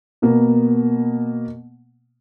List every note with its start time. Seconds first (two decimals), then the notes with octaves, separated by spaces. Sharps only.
0.22 B2 A#3 B3